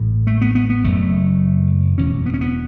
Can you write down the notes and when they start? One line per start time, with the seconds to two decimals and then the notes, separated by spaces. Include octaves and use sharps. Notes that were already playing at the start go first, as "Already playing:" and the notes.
Already playing: A1 A2
0.27 A3
0.41 B3
0.55 B3
0.70 B3
0.84 F#1 F#2 C#3 A3
1.97 E1 E2 B2 C#4
2.26 B3
2.34 C#4
2.41 B3